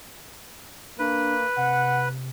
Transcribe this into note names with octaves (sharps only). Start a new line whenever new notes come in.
A#3 D4 B4
C3 F#5